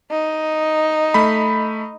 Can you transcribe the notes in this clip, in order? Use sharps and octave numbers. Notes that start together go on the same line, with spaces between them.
D#4
A3 B5